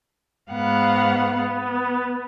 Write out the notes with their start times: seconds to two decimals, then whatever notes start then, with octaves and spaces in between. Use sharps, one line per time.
0.51 G#2 B3 F5 F#5
1.37 B3